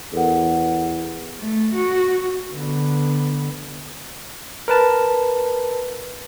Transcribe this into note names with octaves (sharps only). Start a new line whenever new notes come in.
E2 A4 A#4 F#5
A3
F#4
D3 B3
A#4 B4 A5